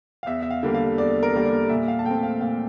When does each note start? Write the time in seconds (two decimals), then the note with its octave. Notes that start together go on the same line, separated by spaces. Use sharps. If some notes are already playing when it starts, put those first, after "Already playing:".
0.23 F5
0.26 E2 E5
0.43 E5
0.51 F5
0.63 D3 G3 A#3
0.75 F5
0.98 E2 D5
1.23 A#4
1.33 D3 G3 A#3
1.45 D5
1.69 A#2 E5
1.88 F5
1.99 A5
2.05 A3 C4 G5
2.23 F5
2.41 A#2 F5